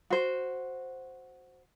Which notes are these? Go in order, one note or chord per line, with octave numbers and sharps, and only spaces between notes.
F#4 C5